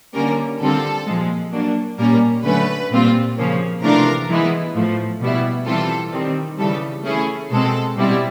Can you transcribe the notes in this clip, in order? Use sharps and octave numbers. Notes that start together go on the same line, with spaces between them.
D3 G3 A#3 C#4 A#4
D3 G3 C4 F4 A4
A#2 F3 G#3
F#3 A#3 D4
A#2 G3 A#3 C#4 A#4
D3 F#3 A3 C#4 B4
A#2 G3 C4 F4
C#3 F3 A#3 C#4
C3 E3 A3 D4 F4 A#4
E3 G#3 B3 E4
A2 F3 A3
B2 G3 B3 E4
E3 G3 C4 F4 A4
D#3 G3 C4
C#3 E3 G3 A4
E3 A3 C#4 E4 G#4
B2 G#3 C4 A4
B2 G3 C4 E4